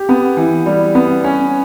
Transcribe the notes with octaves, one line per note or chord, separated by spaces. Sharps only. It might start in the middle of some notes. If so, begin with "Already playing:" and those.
Already playing: G4
B3
E3
G3
B3
C#4